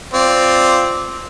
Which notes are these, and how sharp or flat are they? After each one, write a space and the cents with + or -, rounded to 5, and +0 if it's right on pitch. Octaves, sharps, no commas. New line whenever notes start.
C4 +0 F4 +0 D5 +0